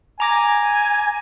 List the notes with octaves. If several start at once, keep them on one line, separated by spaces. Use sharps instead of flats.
G#5 A#5 D6 A#6